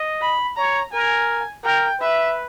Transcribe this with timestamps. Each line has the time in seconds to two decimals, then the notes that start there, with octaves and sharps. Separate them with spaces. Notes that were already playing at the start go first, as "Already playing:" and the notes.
Already playing: D#5
0.21 B5
0.57 C#5 A#5
0.92 A#4 G#5
1.64 A#4 G5
2.00 B4 E5